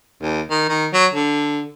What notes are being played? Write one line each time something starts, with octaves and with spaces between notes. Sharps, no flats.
D#2
D#3
D#3
F#3
D3